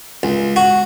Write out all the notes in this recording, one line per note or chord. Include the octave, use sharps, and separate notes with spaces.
C#2
F#4